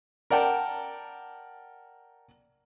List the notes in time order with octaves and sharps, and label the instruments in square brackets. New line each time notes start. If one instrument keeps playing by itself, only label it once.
[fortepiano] A#4 D5 F#5 G5 A5